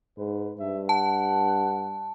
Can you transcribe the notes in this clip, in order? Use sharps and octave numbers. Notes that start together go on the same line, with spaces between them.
G#2 B4
G2 E5
F#5 A5